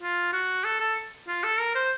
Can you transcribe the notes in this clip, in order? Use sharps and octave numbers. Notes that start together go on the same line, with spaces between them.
F4
F#4
A4
A4
F4
A4
A#4
C5